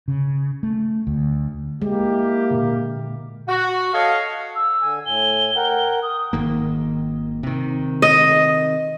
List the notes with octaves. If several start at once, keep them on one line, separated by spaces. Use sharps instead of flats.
C#3
A3
D2
G#3 A#3 E4 G4
A#2 D3
F#4
A4 C#5 D#5 F5
E6
D3 G#5
A2 G#5 G7
A#4 F#5 G5
D#6
G#1 D#3 A#3
C3 D#3
D#5